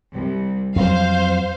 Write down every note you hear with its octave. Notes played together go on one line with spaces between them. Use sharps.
C2
F2 F#3 C5 F5